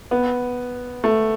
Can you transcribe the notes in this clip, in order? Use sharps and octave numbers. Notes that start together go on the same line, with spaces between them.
B3
A3